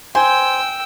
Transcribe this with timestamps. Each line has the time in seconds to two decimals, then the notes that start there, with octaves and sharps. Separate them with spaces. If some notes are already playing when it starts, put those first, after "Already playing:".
0.15 C5 G5 G#5 E6